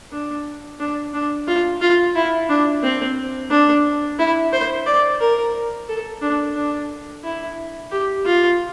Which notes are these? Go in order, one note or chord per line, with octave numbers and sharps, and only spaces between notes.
D4
D4
D4
F4
F4
E4
D4
C4
D4
E4
C5
D5
A#4
A4
D4
D4
E4
G4
F4